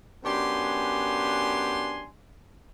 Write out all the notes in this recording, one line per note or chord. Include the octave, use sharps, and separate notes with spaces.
F#2 B3 D4 G4 G#5 C6